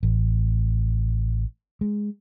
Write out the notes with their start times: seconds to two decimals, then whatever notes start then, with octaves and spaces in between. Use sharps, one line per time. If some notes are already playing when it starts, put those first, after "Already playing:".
0.03 A1
1.81 G#3